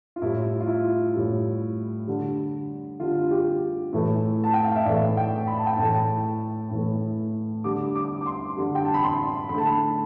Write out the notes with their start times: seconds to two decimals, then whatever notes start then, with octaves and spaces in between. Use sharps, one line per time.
0.16 F4
0.22 A2 G3 E4
0.60 F4
0.67 E4
1.15 A2 G3
2.07 D3 G3
2.99 D3 G3 F4
3.31 G4
3.93 A2 E3 A3
4.44 A5
4.54 G5
4.65 F5
4.76 E5
4.85 A2 E3 A3 D5
5.17 G5
5.47 B5
5.58 A5
5.67 G5
5.77 A2 E3 A3 A5
6.71 A2 E3 A3
7.64 D3 G3 D6
7.95 D6
8.21 D6
8.26 C6
8.56 D3 G3
8.75 G5
8.85 A5
8.94 B5
9.03 C6
9.49 D3 B5
9.54 A3 A5
9.67 B5